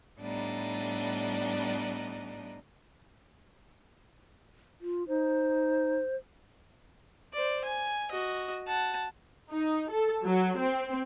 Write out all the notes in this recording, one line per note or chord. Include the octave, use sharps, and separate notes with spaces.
A2 G3 B3 D4 D#4
F4
D#4 C5
C5 D5
G#5
F#4 D#5
F#5 A5
D#4
A4
F#3
C4